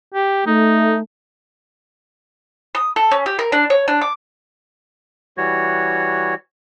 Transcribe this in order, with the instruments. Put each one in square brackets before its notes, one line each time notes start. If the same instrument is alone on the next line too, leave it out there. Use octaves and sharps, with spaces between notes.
[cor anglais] G4
[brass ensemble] A3 [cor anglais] D#4
[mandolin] D#6
A4
C#4
G4
A#4
D4
C#5
D4
D6
[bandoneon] E3 G3 F#4 C#5